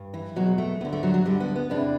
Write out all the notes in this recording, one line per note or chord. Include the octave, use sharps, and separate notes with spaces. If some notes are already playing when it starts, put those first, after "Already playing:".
Already playing: G2
E3
E2 B2 F#3
A3
D2 D3 B3
A3
F#3
F#3
D2 D3 G3
B3
B3
E2 C3 E3 D4